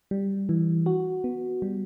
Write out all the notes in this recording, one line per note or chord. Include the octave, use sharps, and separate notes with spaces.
G3
E3
F#4
B3
G3